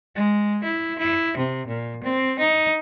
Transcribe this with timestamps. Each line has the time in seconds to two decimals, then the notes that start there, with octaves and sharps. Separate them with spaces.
0.15 G#3
0.64 E4
0.98 E4
1.37 C3
1.67 A#2
2.03 C4
2.39 D#4